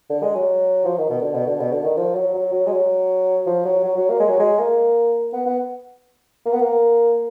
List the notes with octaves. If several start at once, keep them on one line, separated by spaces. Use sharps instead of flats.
D3
G#3
F#3
F3
D#3
B2
D3
B2
D3
B2
D3
D#3
F3
F#3
F#3
F#3
G#3
F#3
F3
F#3
F#3
F#3
A#3
G#3
F#3
G#3
A#3
B3
B3
A#3
B3
A#3